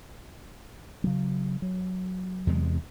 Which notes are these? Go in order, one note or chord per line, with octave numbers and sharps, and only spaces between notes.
C#3 F#3
F#3
E2 C3 G#3